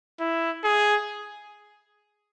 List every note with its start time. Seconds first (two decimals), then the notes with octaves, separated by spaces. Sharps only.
0.20 E4
0.65 G#4